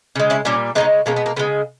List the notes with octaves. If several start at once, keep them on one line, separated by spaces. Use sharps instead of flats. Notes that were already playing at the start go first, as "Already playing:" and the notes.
C#3 G#3
C#4 E4
A#2 G3 A#3 C#4
E3 G#3 B3 D#4
C#3
B2 G#3 A#3 C#4
B3
A#3
C#3 G#3 B3